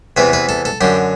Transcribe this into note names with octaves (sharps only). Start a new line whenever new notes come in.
E2 C3 E3 B4
B4
A4
A4
F#2 D3 G4